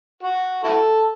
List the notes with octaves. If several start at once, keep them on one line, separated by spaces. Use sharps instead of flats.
F#4
E4 F#4 A4